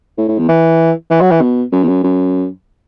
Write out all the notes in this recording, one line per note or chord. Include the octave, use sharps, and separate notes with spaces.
A2
A2
E2
E3
E3
F#3
E3
B2
F#2
E2
F#2
F#2